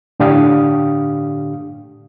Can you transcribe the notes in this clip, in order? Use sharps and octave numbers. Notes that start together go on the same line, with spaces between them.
A2 D3 D4 G4 F5 D#6